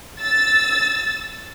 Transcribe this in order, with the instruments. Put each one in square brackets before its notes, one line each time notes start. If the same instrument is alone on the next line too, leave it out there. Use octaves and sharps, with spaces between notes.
[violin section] E6 A6